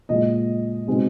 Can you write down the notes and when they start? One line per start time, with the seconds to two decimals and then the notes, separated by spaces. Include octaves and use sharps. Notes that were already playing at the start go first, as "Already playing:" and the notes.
0.09 A#2 F3 G#3 D#5
0.87 B2 G#3 C4 D#4